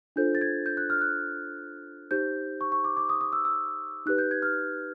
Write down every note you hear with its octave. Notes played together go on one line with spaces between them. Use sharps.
D4 F4 A4 C5 G6
A6
G#6
G6
F#6
F6
F#6
D#4 G4 C5 G6
C#6
C#6
D6
D6
D#6
D#6
E6
E6
D#4 G4 B4 F#6
G6
G#6
F6